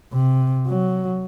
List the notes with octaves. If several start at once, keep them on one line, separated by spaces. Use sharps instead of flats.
C3
F#3